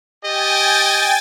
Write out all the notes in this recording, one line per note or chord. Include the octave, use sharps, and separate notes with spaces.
G4 D#5 G5 G#5 A6